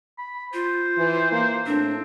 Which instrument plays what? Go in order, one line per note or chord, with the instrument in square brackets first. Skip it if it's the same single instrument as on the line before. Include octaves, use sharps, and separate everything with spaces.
[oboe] B5
[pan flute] F4 [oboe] C5
[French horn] E3
A#3
[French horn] A2 [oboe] C4 [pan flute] D4